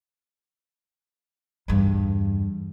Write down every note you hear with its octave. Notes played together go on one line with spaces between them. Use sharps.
E2 G2